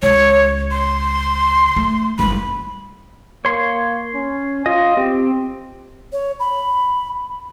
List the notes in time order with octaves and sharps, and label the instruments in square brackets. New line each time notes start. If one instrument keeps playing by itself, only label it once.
[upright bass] C#2 [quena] C#5
[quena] C6
[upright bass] A3
[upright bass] F#1 G3 [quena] B5
[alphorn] A#3 [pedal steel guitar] C#5 C6
[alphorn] C#4
[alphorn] F4 [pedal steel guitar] D#5
[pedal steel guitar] C4 [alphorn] G4
[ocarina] C#5
B5